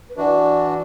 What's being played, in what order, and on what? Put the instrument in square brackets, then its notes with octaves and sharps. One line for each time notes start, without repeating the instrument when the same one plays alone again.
[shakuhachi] B4
[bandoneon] E3 D4 F#4 [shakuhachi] D5 E5